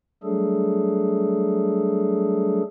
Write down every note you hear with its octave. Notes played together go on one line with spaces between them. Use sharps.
F#3 G3 A3 D4 G#4 A4